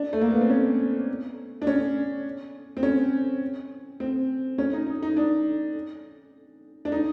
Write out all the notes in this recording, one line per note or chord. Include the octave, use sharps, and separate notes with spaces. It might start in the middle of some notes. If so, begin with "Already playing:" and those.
Already playing: D4
A3
A#3
B3
C4
C#4
D4
C#4
C4
C#4
C4
C#4
D#4
D#4
D#4
D4
D4
D#4